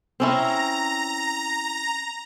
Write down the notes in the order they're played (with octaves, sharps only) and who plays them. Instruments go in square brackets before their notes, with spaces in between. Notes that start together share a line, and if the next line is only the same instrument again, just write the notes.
[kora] C4 C#4 E4 [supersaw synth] A#5